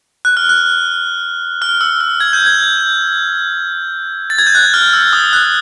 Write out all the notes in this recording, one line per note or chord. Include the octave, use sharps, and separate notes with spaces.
F#6
F6
F#6
F6
E6
F6
G#6
G6
G#6
A6
G#6
G6
F#6
F6
E6
D#6
F#6